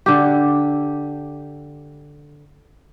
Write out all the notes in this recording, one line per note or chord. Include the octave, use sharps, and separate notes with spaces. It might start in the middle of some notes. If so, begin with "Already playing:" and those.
D3 G4